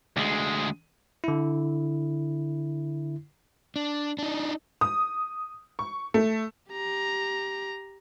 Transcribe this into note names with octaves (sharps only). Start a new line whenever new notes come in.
D2 G#3
D3 E4
D4
D4 D#4
D#6
C#6
A3
G4 A#5